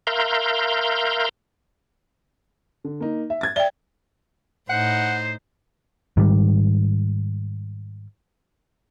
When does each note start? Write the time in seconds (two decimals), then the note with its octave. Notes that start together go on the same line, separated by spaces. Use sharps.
0.07 A#4 E5 F5 A#5 C6 G6
2.84 D3
3.00 A#3 D#4
3.30 E5
3.41 G#6 A6
3.56 D5 E5 G5 G7
4.69 A2 D#4 C5 F#5
6.17 G#2 D#3 G3